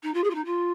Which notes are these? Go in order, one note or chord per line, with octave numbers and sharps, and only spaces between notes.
D#4
F4
G#4
F4
D#4
F4